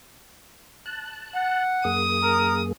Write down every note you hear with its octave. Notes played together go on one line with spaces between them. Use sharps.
A5 F#6
F#5
F#2 A#3 G#4 D#6
A#4